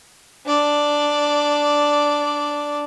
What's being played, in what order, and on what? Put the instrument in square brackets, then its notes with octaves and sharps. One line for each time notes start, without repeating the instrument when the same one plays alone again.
[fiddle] D4 D5